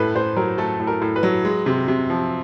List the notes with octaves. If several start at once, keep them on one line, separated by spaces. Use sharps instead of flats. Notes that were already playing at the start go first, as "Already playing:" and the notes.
Already playing: A2 A3 B4
A2 C5
F#3 A#4
A3 A4
A2
A#4
A2
B4
F#3
G#3
C3
C3
F3